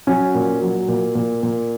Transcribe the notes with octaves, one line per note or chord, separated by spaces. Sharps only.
F#3 C#4
A#2
F#3
A#2
A#2
A#2